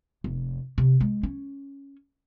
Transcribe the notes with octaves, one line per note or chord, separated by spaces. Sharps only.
F1
C3
G#3
C#4